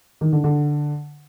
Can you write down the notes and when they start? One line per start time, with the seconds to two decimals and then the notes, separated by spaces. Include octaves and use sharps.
0.21 D#3
0.33 D3
0.44 D3